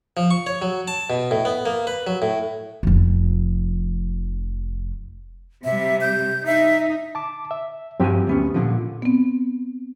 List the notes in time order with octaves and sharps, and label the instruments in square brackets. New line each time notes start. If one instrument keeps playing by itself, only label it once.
[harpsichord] F3
C#6
C#5
F#3
A5
B2
A2
B3
A#3
B4
F#3
A2
[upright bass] F1 F3
[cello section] C3 G3 [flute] E5
[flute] G6
[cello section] D#4 [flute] E5
[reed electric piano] A5 D6
E5
[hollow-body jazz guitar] G2 F3 G#5 [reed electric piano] F#3 C4 G4
[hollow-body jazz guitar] D2 B3 C#4
A#2 D3 F3
[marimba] B3 C4